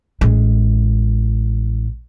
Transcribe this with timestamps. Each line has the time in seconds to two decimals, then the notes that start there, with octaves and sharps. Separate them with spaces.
0.21 A1 G#3